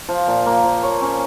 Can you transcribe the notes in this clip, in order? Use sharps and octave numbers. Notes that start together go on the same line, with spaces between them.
F3
A#2
A#3
F3
C#5
C#4